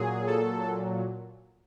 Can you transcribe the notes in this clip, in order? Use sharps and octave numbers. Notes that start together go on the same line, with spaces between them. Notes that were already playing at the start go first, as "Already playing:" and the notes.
Already playing: A#2 F#3 G#4
A4